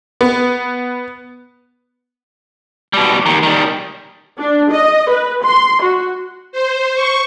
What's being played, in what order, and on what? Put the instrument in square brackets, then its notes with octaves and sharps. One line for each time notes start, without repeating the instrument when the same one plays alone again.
[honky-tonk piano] B3
[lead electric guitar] B2 G3
D#2 D#3
D#3 G3
[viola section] D4
D#5
B4
C6
F#4
[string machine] C5
C#6